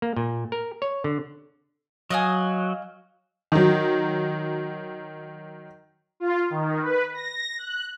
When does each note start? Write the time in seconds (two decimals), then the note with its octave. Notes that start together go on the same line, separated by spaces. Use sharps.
0.02 A#3
0.17 A#2
0.52 A#4
0.82 C#5
1.04 D3
2.10 F#3 D#5 F5 G#5
3.52 D#3 F#3
6.20 F4
6.50 D#3
6.82 B4
7.14 A#6
7.58 F#6